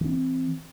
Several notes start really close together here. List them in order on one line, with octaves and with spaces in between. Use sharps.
E3 C#4 C4